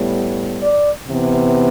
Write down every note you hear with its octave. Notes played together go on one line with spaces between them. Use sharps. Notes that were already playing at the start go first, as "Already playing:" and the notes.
Already playing: A2 G3 B3
D5
C3 E3 B3